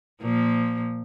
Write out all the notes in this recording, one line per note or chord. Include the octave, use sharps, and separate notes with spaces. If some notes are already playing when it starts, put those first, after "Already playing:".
A#2 F3